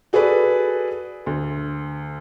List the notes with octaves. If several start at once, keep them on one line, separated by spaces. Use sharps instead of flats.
F#4 G#4 A4 B4 D5
D2